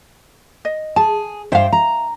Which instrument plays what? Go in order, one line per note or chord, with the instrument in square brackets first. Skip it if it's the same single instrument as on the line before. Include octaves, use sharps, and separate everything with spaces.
[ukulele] D#5
[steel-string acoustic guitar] G#4 [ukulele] A5
[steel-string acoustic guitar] G2 C5 G5 [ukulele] E5 F5
[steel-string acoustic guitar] A#5